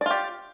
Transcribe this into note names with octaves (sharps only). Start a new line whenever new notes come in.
F4 G4 D5